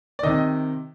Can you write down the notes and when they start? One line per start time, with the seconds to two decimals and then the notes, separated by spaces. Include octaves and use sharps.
0.19 D5
0.23 C3 D#3 D#5